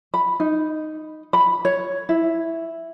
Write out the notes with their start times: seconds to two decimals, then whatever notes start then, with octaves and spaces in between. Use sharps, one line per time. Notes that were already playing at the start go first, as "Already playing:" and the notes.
0.14 B5
0.40 D#4
1.33 B5
1.65 C#5
2.09 E4